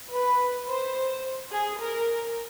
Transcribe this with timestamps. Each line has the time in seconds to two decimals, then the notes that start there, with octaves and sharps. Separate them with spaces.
0.10 B4
0.67 C5
1.51 G#4
1.80 A#4